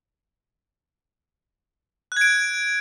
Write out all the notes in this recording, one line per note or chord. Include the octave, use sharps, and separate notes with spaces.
F#6 G#6 D7